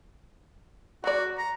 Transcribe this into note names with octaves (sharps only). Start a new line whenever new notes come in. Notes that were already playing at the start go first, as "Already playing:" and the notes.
F#3 F#4 D5
A#5